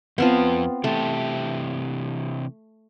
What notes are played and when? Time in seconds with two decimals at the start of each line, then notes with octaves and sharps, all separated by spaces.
0.18 F2 B3 C4 F4 A5
0.84 C3 E3 A3 G4